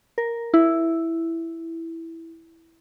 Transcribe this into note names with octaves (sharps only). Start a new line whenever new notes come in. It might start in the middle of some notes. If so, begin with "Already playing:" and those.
A#4
E4